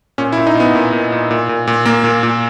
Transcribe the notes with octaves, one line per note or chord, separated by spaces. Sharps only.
A#2 C#4
E4
A#2
D#4
A#2 B3
A#2
A#2
A#2
A#2
A#2
A#2
A#2 A#3
A#2
A#2